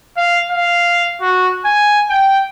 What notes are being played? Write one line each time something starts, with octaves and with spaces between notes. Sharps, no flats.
F5
F5
F#4
G#5
G5